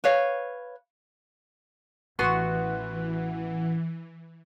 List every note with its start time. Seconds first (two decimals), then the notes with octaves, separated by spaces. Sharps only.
0.04 B4 C#5 F5
2.19 A1 E3 B3 F#4 C6